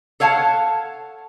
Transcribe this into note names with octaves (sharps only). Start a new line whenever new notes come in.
A4 C#5 F5 F#5 A5